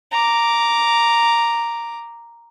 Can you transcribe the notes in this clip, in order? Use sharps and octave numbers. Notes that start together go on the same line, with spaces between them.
A#5 D6